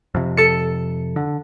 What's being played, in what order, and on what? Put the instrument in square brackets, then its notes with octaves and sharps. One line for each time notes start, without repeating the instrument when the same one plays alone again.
[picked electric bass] F2 C3
[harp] A4 C#7
[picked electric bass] D3